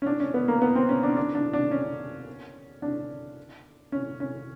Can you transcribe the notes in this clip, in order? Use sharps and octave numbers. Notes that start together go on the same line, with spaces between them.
C#4
D4
C#4
B3
A#3
B3
C4
C#4
D4
D4
D4
D4
C#4
D4
C#4
C#4